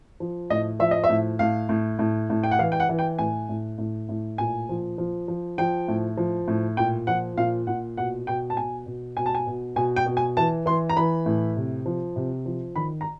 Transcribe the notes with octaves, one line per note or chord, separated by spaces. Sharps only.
F3
A2 D#5
F3 E5
D#5
E5
A2
A2 F5
A2
A2
A2
G5
F#5
E3 F5
G5
F#5
E3
G5
A2 G#5
A2
A2
A2
A#2 G#5
F3
F3
F3
F3 G5
A2
F3
A2
A#2 G5
F3 F#5
A#2 F5
A#2 F#5
B2 F#5
B2 G5
A5
B2 G#5
B2
B2 G#5
A5
G#5
B2
B2 G#5
G5
B2
G#5
E3 A5
E3 C6
A#5
E3 B5
A2
C3
F3
C3
F3
D#3 B5
A#5